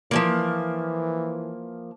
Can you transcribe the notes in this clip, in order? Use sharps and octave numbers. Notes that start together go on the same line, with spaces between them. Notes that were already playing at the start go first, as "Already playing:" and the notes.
E3 F3 G#3 A#3